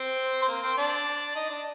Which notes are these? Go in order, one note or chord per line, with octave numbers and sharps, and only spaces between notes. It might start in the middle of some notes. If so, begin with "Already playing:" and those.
Already playing: C4 C5
C5
A#3 A#4
C4 C5
D4 D5
D#4 D#5
D4 D5